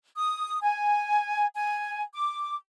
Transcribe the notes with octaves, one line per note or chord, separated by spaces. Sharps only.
D#6
G#5
G#5
D6